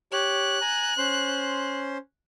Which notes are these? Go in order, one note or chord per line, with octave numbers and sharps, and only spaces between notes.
G4 C#5 F#6
G#5 A#5
C#4 C5 C6